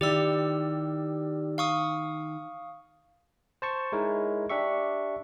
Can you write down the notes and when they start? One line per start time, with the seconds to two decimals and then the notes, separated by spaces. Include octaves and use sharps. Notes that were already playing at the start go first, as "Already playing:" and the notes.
0.01 D#3 E4 G4 D5 E6
1.58 F5 C#6 D#6
3.62 C5 A5 C#6
3.92 G#3 D#4 E4 A#4 C#5
4.49 D4 G4 E5 C#6